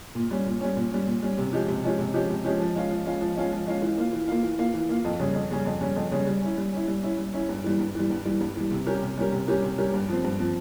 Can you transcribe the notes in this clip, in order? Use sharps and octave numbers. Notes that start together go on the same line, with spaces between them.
A#2
G3 C#4
A#2
G3 C#4
A#2
G3 C#4
A#2
G3 C#4
C3
F3 G#3 C#4 G4
C3
F3 G#3 C#4 G4
C3
F3 G#3 C#4 G4
C3
F3 G#3 C#4 G4
F3
G#3 C#4 F4
F3
G#3 C#4 F4
F3
G#3 C#4 F4
F3
G#3 C#4 F4
E3
A#3 F4
E3
A#3 F4
E3
A#3 F4
E3
A#3 F4
F2
C#3 G3 C#4
F2
C#3 G3 C#4
F2
C#3 G3 C#4
F2
C#3 G3 C#4
G3
C#4 E4
G3
C#4 E4
G3
C#4 E4
G3
C#4 E4
G2
E3 G3
G2
E3 G3
G2
E3 G3
G2
E3 G3
C3
G3 C#4 G4 A#4
C3
G3 C#4 G4 A#4
C3
G3 C#4 G4 A#4
C3
G3 C#4 G4 A#4
G2
F3 C4
G2
F3 C4